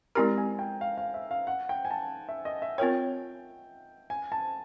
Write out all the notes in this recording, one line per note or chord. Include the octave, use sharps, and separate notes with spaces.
G#3 C4 E4 G4 A#4 A#5
G#5
G5
F5
F5
E5
F5
F#5
G5
G#5
A5
E5
D#5
E5
C4 F4 A#4 C#5 G5
G#5
A5